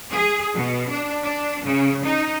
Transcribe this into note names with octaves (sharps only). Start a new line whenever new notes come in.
G#4
B2
D4
D4
C#3
D#4